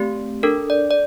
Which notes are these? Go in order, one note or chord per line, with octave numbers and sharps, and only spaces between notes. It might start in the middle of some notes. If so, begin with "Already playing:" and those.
Already playing: A3 C4 G4
D4 A4 A#4
D5
D5